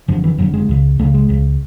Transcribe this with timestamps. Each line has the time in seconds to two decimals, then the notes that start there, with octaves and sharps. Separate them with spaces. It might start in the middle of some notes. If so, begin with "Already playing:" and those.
0.08 F#1 F2 D3 F3
0.24 E3
0.38 F#1 F2 D3 F#3
0.54 G#3
0.69 C#2 C#3
0.99 C#2 C#3 A3
1.14 G#3
1.29 C#2 C#3